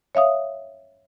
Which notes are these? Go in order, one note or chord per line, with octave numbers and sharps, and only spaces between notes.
C#5 E5 F5 D#6